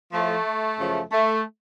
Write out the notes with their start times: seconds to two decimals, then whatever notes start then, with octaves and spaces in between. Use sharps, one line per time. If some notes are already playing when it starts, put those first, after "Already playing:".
0.13 A2 F3 A3
0.79 F#2 C#3 F3
1.12 A3